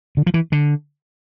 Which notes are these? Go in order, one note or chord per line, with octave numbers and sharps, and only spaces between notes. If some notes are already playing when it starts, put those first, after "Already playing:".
D3
F3
E3
D3